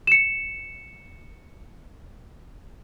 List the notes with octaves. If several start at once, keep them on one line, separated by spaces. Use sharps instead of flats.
C#7 E7